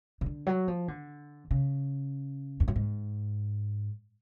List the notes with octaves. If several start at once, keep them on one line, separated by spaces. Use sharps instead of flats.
C#3
D3
F#3
F3
D3
C#3
F2
F#2
G#2